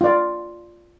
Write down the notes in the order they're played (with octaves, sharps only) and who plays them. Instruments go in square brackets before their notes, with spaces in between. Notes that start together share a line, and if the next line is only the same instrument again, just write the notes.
[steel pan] F4 D5